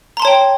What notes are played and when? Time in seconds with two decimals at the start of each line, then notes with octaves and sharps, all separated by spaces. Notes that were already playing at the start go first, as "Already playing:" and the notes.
0.17 A#5
0.20 C6
0.22 A5
0.25 C#5
0.27 G5